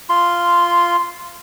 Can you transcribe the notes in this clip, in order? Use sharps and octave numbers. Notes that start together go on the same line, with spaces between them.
F4 C6